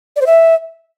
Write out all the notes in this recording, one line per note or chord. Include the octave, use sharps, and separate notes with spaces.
D5
C5
E5